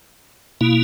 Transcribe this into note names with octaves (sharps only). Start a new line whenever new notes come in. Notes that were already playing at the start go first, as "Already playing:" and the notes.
B2 A#3 E4